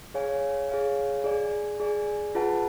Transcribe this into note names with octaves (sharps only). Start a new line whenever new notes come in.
G#4 C#5 F5 G#5
G#4 C#5 F5 G#5
G#4 D5 G#5
G#4 D5 G#5
F4 G#4 B4 F#5 A5